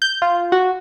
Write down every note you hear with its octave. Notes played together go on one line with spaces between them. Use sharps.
G6
F4
F#4